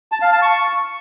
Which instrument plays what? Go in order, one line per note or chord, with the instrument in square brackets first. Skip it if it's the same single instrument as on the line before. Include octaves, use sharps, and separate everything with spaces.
[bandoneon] A5
F5
A5
C#6